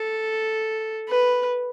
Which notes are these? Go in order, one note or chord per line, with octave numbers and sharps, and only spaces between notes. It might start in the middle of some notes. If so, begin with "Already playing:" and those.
Already playing: A4
B4